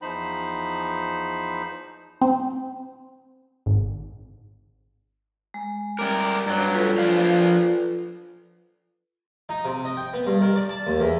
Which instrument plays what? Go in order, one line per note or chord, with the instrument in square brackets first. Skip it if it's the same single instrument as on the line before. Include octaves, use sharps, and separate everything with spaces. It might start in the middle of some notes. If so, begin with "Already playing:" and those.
[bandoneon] E2 F3 D#4 C5 B5
[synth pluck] C4
G#1
[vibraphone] G#3
[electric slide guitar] G3 A#4 [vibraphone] D6
[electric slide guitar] G2 F#3 [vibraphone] A#5
[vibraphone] F4 A4 B4
[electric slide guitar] F3 D4 F5
[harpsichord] D#4
C3
D#5
G5
B3
G2
D#3
D5
A5
D#2
E2